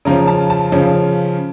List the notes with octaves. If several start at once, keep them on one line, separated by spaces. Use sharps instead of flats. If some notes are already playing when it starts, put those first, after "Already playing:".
C#3 F3 C#4 A#5
A5
A5
C#3 F3 C#4